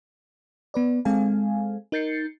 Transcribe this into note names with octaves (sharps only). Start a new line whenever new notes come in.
B3 B4 D5
G#3 C4 A4 F5 G#5
D#4 A#4 G6 A6 C7 C#7